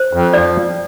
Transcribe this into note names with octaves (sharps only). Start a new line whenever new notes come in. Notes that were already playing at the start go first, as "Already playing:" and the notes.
Already playing: C5
F2
F3 D5